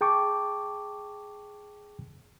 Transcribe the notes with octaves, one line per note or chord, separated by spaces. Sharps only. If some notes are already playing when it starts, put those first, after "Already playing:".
G#4 G5 A5 C#6 D6